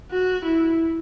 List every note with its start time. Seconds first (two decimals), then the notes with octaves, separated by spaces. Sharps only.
0.11 F#4
0.44 E4